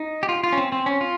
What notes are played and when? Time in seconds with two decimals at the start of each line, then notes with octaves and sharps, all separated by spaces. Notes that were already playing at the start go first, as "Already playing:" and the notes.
Already playing: D#4
0.23 G4
0.29 F4
0.44 F4
0.52 C#4
0.57 C4
0.72 C4
0.86 C#4
1.01 F4